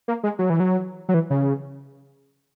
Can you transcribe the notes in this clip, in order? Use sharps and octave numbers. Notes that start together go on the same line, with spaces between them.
A#3
G#3
F#3
E3
F#3
F#3
E3
C#3